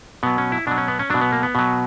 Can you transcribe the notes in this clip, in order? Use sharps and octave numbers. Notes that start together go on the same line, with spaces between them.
B2 F#3 B3
C#4
E4
B2 F#3 D4
C#4
B3
C#4
B2 F#3 D4
B3
A#3
B3
B2 F#3